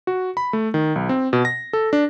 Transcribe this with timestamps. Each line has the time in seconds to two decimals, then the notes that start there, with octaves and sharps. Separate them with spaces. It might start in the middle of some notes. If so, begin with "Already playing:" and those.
0.07 F#4
0.37 B5
0.53 A3
0.74 D#3
0.96 B1
1.09 C4
1.33 B2
1.45 A#6
1.73 A4
1.93 D4